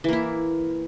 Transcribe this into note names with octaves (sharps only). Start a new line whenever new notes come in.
E3 A#3 E4